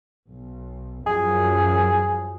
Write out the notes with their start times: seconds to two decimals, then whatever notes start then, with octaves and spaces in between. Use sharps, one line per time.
0.30 B1
1.07 F#2 F3 F#3 G#4